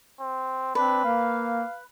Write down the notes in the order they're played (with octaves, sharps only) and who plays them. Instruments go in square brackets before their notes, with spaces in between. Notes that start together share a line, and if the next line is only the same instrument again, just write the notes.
[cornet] C4
[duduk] C4 [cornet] D4 [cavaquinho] B4
[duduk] A#3 [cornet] F5